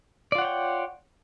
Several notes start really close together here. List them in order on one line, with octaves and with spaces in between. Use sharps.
D5 F4 F#5 C#5 G5